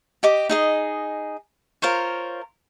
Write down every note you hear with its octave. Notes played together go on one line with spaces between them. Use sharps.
G4 D#5 D6
D#4 G#4 D#5
F4 A#4 C5 C#5